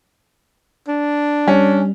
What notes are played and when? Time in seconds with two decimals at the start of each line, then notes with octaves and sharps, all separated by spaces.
0.88 D4
1.48 G3 C#4